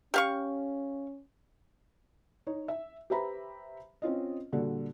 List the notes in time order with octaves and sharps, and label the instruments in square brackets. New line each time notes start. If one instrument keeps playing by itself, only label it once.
[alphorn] C#4 [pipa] G4 F5 C#6
[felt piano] D#4 C#5
E5
G4 B4 C5 E5 A#5 B5
C4 C#4 F4 D#5
A#2 D3 G3 F#4